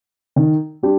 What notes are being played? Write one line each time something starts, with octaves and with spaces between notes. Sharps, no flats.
D#3
G3 D4 G4